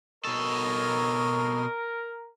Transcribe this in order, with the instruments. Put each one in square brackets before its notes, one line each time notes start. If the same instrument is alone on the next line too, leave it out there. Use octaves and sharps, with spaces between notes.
[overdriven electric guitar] B2 A4 [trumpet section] A#4 [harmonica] C#5 D#5